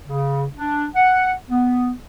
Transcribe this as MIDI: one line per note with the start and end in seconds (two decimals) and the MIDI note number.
0.08 0.44 49
0.56 0.86 62
0.96 1.31 78
1.50 1.92 59